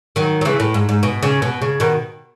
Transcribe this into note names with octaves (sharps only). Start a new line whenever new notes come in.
D#3 F#3
F#3
C#3 E3
A2
G#2
G#2
B2
C#3
B2
C#3
B2 D#3